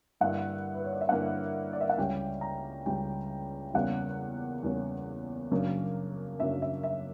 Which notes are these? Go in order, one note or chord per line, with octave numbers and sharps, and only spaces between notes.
G2 D3 A#3 E4 F#5
B4
C#5
D5
E5
G2 D3 A#3 E4 F#5
D5
E5
F#5
C#2 C#3 G3 C#4 G5
A#5
C#2 C#3 G3 C#4 G5
E2 C#3 G3 A#3 C#4 F#5
E2 C#3 G3 A#3 C#4
F#2 C#3 F#3 A#3 D4
F#2 C#3 F#3 A#3 D4 E5
E5
E5